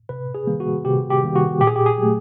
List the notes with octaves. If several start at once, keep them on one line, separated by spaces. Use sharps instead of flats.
C3 B4
G#4
D#3 G3 A#3
F#4
C3 G4
G4
D#3 G3 A#3
F#4
A#2 G4
G#4
G4
G#4
F#3 A3